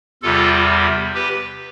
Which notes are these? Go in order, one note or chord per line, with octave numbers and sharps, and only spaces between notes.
E2 C3 G3 F4 A4
G4 B4